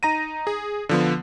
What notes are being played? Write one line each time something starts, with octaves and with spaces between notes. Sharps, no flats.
D#4 A#5 A#6 D#7
G#4
D3 F3 B3